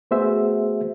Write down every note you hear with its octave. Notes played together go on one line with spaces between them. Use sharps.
A3 B3 F#4 G#4 C5 E5